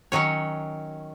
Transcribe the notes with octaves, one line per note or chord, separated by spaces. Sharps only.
D#3 F#3 C#4 C#5